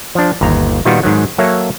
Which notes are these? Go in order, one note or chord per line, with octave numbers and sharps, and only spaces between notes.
F3 D4
G1 D#2 A#5
A#2 D#3 G3 B3 F4 F#4
G#2 D#3 F#3
F#3 A#3 A4 C#5 E5